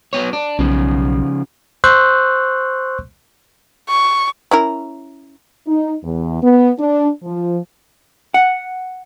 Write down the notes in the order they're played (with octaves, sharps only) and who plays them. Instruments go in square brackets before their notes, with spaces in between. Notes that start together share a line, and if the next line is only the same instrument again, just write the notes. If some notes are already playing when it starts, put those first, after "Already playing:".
[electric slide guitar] F#3 B3 C#5
D4
[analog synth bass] B1 [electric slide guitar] C#3 F3
[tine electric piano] C5 C6 C#6 E6 F#6 G6
[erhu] C#6
[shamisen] C#4 E4 A#4
[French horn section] D#4
E2
B3
D4
F3
[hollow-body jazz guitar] F#5